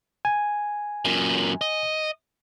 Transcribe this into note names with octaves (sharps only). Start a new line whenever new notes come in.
G#5
F#2 A#2
D#5